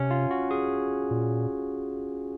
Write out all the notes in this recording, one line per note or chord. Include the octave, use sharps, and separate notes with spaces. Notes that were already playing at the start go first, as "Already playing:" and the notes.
Already playing: C3 C#4
F4
F#4
G#4
A#2